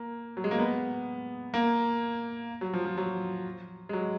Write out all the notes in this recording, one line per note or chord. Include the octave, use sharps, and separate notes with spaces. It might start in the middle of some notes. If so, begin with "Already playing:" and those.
Already playing: A#3
F#3
G#3
A#3
B3
A#3
F#3
F3
F3
F#3
G#3
F#3